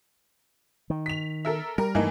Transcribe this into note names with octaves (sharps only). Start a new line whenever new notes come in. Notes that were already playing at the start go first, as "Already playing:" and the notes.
D#3
B6 F7
A4 A#4 E5
G3 A#4
G2 E3 A3 A#3 D#4